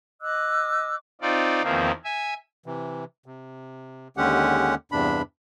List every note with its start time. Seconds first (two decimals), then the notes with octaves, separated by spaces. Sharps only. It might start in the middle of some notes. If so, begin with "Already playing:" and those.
0.21 D#5 D6 E6 F#6
1.21 C4 D#4 F4 D5
1.63 E2 D#3 F3 A#3 C4
2.04 E5 G#5
2.66 C3 E3
3.26 C3
4.17 D#2 D3 G#3 C#4 G4 F#5
4.92 E2 G2 C3 D4 B5